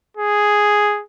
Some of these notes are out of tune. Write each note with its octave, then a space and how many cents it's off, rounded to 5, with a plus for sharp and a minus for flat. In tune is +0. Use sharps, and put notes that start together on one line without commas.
G#4 +0